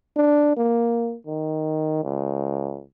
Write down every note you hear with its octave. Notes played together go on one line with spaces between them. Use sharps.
D4
A#3
D#3
C#2